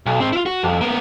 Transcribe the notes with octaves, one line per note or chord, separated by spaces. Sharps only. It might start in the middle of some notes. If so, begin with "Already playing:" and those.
B1
G#2 C4
E4 F4
F#4
F2
A#3 B3